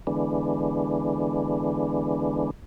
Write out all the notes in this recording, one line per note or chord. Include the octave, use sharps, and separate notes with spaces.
D3 E3 G#3 B3 D4